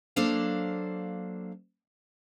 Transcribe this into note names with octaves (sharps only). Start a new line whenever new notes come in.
F#3 A#3 D4 A4 C5 F5